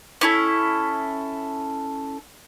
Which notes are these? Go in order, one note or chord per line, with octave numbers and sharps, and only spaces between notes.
C#4 E4 A4